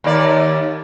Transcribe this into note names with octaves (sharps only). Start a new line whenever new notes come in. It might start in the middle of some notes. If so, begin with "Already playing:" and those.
D#2 A#3 D5